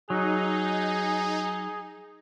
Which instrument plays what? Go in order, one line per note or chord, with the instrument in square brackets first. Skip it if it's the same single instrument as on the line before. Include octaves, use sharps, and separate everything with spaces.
[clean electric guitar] F#3 [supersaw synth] D#4 [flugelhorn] G#4